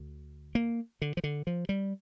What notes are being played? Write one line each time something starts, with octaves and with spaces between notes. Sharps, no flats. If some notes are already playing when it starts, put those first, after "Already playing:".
Already playing: D2 D3
A#3
D3
F3
D3
F3
G3